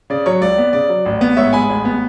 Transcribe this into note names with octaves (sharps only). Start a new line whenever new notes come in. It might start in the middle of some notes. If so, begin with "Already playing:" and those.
C#3 D5
F#3 C#5
C#2 D5
B3
C#3 D5
F#3
A1
B3
G#2 C#5 E5
G#3 G#5 B5
A1
B3